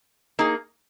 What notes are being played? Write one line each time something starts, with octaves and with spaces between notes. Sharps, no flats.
A#3 D#4 G#4